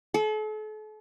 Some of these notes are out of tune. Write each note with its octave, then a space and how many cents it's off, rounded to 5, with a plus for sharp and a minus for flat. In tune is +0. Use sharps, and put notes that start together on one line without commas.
A4 -40